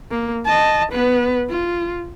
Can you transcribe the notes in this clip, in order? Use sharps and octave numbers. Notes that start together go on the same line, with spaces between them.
A#3
D#5 A5
B3 B4
F4